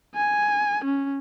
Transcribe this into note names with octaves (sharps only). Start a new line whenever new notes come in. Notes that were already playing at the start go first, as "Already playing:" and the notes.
G#5
C#4